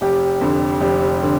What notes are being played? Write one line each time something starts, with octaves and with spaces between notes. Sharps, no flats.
F1 G4
F2 D3
F1 G4
D3